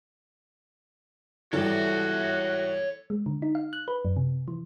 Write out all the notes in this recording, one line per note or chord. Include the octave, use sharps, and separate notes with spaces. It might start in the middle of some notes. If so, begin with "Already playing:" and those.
E3 G3 F#4 A4 C#5 E5
G#3
D3
D#4
F5
F#6
B4
F#2
C3
E3